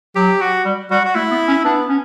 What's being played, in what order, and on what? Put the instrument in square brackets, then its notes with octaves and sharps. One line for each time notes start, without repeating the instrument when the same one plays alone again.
[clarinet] F#3 [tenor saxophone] G4
[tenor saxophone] F#4
[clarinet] G3
[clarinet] G3 [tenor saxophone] F#4
[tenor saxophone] F#4
[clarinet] A3 [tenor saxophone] E4
[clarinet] B3
C#4
[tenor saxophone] B3 [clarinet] D4
[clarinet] C#4